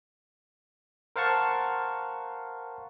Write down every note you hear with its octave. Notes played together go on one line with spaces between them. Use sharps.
A#4 C5 F5 F#5 A5 C#6